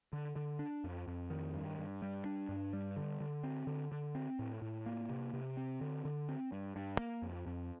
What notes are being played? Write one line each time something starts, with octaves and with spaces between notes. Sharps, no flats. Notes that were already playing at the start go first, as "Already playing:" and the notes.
D3
D3
D4
F2
F2
D#3
G2
G2
G3
D4
G2
G3
D3
D3
C4
D3
D3
C4
A2
A2
A#3
C3
C3
C4
D3
D3
C4
G2
G2
A#3
F2
F2